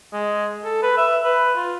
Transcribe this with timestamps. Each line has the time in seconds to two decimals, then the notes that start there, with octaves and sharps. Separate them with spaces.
0.13 G#3
0.64 A4
0.83 B4
0.97 E5
1.24 B4
1.56 F4